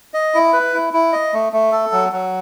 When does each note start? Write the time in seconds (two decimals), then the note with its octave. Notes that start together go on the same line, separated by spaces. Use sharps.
0.14 D#5
0.34 E4
0.53 B4
0.74 E4
0.93 E4
1.13 D#5
1.33 A3
1.53 A3
1.72 A4
1.92 F#3
2.12 F#3